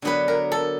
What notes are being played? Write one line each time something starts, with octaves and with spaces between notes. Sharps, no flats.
D3 F#3 B3 B4
A#4
A4